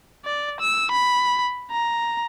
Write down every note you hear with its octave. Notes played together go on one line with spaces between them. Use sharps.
D5
E6
B5
A#5